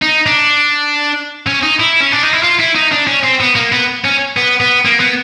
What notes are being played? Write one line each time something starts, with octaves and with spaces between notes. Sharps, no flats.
D#4
D4
C#4
D#4
E4
C#4
D4
D#4
E4
F4
E4
D#4
D4
C#4
C4
B3
A#3
B3
C#4
B3
B3
A#3
B3